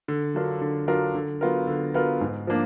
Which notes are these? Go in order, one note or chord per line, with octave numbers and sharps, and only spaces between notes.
D3
F#3 D4 F4 A#4
D3
F#3 D4 F4 A#4
D3
F#3 B3 F4 A#4
D3
F#3 B3 F4 A#4
G#2
F3 A#3 D4